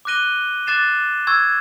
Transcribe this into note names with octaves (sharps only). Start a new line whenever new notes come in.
D6 F#6 A#6 D#7 G7
D6 F#6 A6 C7 E7
C#6 E6 G#6